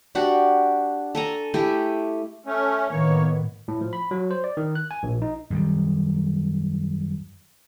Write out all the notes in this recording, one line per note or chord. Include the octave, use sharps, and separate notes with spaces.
D4 F#4 G4 F#5
A4 G#5 A#5
A3 E4 G4 G#4
A3 C#4
A2 D#3 A#3 B3 C#5
A2
F3
B5
F#3
C5
D5
D#3
F#6
G#5
A#1
D#4
F#2 D#3 G3